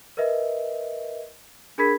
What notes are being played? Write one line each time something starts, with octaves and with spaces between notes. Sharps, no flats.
A#4 B4 D#5 E5
D4 G#4 A#4 B5 G#6 B6